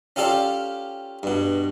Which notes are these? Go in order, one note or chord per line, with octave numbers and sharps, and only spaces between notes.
C#4 F4 G4 A4 D5 F5
G2 B2